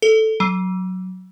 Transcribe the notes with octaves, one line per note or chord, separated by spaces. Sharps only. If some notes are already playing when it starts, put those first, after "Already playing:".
A4
F#3